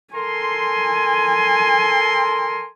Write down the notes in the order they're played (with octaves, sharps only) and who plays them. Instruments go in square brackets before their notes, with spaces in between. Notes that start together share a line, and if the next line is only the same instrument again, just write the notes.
[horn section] A4 A#4 C6 [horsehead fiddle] G#5